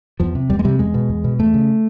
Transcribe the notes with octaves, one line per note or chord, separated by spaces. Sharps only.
E2 F3
C3
E2 G3
G#3
C3 G3
E2 G#3
B2
E2
B2
E2 A3
C#3